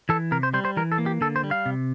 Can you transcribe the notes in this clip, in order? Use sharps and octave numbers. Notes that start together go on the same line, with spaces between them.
E3 A4
C3 A#4
C5
G3 C5
C5
E3 A#4
A4
A#3
G4
D3 A4
C5
G3
F5
C3